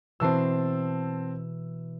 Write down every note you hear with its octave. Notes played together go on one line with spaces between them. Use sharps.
B2 E3 C4 A5 E6 C7